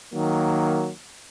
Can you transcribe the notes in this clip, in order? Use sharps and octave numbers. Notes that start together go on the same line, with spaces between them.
D#3 F#3 A#3